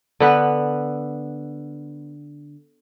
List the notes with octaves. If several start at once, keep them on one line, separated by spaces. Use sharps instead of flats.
D3 B3 B4